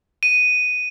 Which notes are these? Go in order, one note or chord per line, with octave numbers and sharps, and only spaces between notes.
D#7